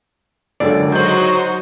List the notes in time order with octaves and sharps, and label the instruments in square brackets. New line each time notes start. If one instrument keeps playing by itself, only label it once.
[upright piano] C#2 F#2 D3 [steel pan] D5
[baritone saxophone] F#3 [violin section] D#4 F#4 C5 [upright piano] G6 F#7